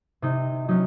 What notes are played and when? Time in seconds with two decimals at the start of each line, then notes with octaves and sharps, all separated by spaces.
0.22 C3 D#4
0.68 F#3 C#4 D#4